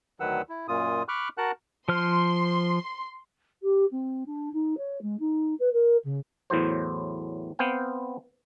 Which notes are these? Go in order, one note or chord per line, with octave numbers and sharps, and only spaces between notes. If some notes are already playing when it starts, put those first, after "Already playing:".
D2 D#3 F#3 B4 F#5 E6
E4
F#2 A#2 F4 D#6
B5 C#6 D6 F6 F#6
F#4 A#4 F#5 A5 F#6
F3 C5 C6 F6
G4
C4
D4
D#4
C#5
G#3
D#4
B4
A#4
C#3
E2 A2 E3 F#3 C5
B3 C4 F5 G5